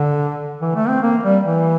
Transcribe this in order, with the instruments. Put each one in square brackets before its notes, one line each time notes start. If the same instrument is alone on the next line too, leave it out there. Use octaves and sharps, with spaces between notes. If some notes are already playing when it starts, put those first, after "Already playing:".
Already playing: [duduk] D3
E3
A3
C4
A#3
G3
E3